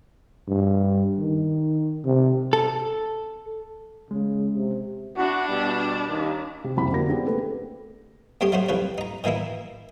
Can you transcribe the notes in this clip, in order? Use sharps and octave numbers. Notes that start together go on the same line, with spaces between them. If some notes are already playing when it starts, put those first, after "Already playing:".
G2
D#3
C3
A4
C#3 G#3
C3
D4 E4 F#4
B2 G3
D#2
C3
F#1 C2 F2 B5
D3 A#3 F#4 A#4 A#6
B3 C4 D4 G4 G#4
A3 A#3 G#4 A4 B4
G2 A3 C4 G4 G#5 D#6
F#3 A3 D#4 F#4 C5
C2 F3 B4 C#5
D#4 A#5
D#3 E3 A#3 D#4 E4